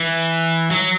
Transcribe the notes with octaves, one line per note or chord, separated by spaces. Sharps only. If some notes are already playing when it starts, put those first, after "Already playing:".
Already playing: E3
F#3